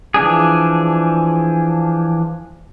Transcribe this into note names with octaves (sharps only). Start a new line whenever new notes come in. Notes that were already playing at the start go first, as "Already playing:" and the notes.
E3 F3 D4 G#4